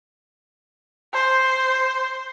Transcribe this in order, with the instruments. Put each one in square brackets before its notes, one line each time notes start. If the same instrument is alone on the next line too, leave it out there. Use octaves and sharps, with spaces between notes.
[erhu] C5